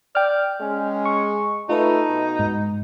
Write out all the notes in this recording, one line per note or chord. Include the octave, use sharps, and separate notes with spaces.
D5 G5 F6
G#3 C#4
C#6
A3 D#4 F4 B4
B2
G#2